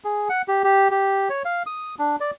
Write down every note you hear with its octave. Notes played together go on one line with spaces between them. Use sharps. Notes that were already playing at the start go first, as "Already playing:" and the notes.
G#4
F#5
G4
G4
G4
C#5
F5
D#6
D4
D5